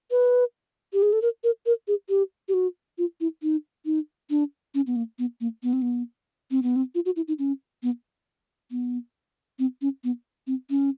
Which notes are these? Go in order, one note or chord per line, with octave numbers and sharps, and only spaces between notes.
B4
G4
G#4
A4
A#4
A#4
A#4
G#4
G4
G4
F#4
F4
E4
D#4
D#4
D4
C#4
B3
A#3
B3
A#3
B3
C4
B3
C4
B3
C4
F4
F#4
E4
D#4
C#4
B3
B3
C4
C#4
B3
C4
C#4